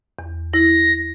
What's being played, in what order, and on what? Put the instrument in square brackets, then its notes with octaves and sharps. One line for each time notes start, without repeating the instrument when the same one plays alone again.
[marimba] E2
[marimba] E4 [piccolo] A#6